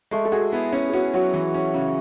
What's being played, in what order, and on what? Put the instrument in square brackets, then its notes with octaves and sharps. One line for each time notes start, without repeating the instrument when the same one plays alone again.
[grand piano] G#3 [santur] A3
[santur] A4
[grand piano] F#4 [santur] G#4
[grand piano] B3 [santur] E4
[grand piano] C#4 [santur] E4
[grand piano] C#4 [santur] F#4 G#4
[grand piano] F#3 [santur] F#4
[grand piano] E3
C#4
C#3